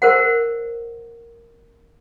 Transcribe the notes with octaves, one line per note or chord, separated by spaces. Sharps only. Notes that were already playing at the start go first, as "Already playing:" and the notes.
A#4 C5 F#5